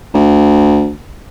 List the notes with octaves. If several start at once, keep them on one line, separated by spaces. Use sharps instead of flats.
D2